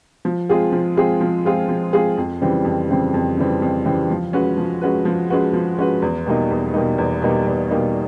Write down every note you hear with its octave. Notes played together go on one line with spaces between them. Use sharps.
F3
G#3 C4 F4 G#4
F3
G#3 C4 F4 G#4
F3
G#3 C4 F4 G#4
F3
G#3 C4 F4 G#4
F2
C#3 E3 G3 C4
F2
C#3 E3 G3 C4
F2
C#3 E3 G3 C4
F2
C#3 E3 G3 C4
F3
G#3 C#4 F#4 B4
F3
G#3 C#4 F#4 B4
F3
G#3 C#4 F#4 B4
F3
G#3 C#4 F#4 B4
E2
B2 G3 A#3 D#4
E2
B2 G3 A#3 D#4
E2
B2 G3 A#3 D#4
E2
B2 G3 A#3 D#4